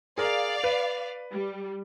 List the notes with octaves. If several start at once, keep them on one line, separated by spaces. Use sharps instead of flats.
G#4 A#4 D5 F5
B4
G3